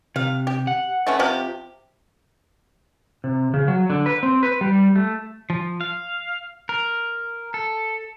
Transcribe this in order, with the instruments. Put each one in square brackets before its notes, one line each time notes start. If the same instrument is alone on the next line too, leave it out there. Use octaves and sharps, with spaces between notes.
[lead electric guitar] C3 [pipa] F5
[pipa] G4
[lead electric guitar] F#5
[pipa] E3 A3 C#4
C3 F3 G4
[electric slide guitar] C3
C#3
F#3
D3
B4
C4
B4
G3
A3
[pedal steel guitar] F3
F5
A#4
A4